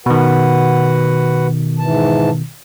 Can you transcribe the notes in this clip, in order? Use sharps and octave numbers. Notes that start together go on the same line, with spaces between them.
B2 D#3 F#4 B4 F#5
G#2 E3 A5